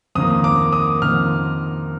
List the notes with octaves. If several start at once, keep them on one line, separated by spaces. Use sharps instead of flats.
F2 D#3 A#3 D#6
D6
D#6
F2 D#3 A#3 F6